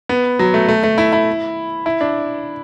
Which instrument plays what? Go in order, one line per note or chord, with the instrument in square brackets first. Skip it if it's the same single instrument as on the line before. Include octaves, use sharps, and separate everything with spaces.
[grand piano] B3
F#3
A3
A3
A3
E4
E4
E4
D4